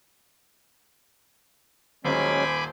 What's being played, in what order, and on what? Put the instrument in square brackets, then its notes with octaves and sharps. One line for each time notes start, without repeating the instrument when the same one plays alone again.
[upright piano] D#1 [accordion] F#3 G#3 C#4 [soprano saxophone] C5 [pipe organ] G#5 B5 D6